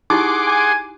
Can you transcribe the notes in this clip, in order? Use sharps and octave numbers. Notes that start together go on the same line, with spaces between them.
D#4 E4 G4 G#4 F#5 C6 D6
G#5